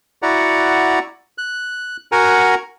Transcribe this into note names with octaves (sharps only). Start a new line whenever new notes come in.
E4 F#4 D5 F#5 A#5
F#6
F#4 A#4 F#5 G#5 A#5